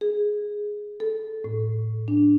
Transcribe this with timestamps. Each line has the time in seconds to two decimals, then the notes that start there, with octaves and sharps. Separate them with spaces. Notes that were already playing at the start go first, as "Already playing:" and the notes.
0.01 G#4
1.00 A4
1.44 A2
2.08 D4